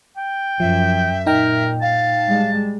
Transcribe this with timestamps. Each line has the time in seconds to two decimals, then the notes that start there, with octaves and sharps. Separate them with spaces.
0.17 G5
0.60 F#2 F3 E5
1.27 A#2 D#4 A#4 G5
1.81 F5 A5
2.27 G3 G#3